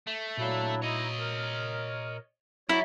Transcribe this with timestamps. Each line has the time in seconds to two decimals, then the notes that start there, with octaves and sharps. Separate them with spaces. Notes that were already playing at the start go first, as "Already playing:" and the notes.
0.07 A3
0.37 A#2 F#3 D4 E4 F#4 F5
0.82 D#4 E4 C#5 D#5 A#5
1.19 A#4
2.69 F#3 E4 F#4 C#5 D5